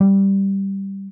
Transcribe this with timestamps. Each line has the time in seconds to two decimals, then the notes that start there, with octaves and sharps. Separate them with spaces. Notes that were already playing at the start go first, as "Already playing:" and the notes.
0.01 G3